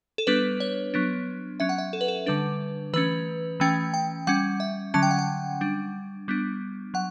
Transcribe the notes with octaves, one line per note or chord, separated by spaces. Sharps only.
A4
G3 B3 D4 B4
C#5
F#3 B3 D4
F#3 C#4 E5
F#5
E5
A4
B4
A4
D3 G3 D4 B4
E3 A3 C#4 B4
E3 A3 C#4 G5
G5
G3 C#4 F#5
E5
D3 F#3 C#4 A5
G5
F#5
G5
G3 D4
G3 B3 D4
F#3 F#5